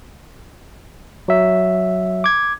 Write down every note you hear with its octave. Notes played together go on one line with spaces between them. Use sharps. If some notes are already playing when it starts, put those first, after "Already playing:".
F#3 E5
D6 G#6